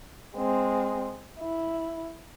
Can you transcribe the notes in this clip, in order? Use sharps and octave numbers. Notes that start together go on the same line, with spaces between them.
G#3 C4
E4